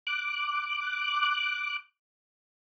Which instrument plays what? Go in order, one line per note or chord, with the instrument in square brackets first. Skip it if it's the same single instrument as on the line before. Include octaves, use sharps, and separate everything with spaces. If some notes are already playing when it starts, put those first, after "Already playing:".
[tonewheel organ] D6 F#6